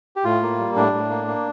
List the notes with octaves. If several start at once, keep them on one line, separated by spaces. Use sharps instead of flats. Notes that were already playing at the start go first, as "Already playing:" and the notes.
G4
A2 F4
A#3
G3
A2 D4
A2
A#3
A#3